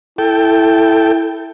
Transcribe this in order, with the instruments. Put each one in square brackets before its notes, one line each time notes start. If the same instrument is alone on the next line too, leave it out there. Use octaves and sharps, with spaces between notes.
[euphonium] E4 [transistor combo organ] A4 G5